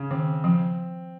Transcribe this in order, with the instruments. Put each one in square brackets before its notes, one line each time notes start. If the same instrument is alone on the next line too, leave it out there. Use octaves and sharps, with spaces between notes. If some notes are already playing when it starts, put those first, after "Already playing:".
Already playing: [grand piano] C#3
[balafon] D#3 [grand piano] C4
[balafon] F3 [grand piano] C4